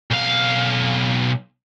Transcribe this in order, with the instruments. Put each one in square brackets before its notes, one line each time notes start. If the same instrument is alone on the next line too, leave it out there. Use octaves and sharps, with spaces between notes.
[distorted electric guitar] B1 F5